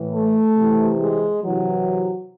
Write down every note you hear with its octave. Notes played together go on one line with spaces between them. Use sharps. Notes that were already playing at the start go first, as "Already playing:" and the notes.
Already playing: A2 E3
A3
C3 E3
G#3
C3 E3 F#3